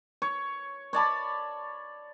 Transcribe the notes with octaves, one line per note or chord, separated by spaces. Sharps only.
C#5
C#5 D5 A5 B5